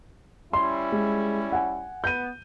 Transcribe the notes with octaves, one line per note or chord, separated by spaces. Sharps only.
G3 C#4 E4 C6
G#3
F#5 G#5
B3 G6 D#7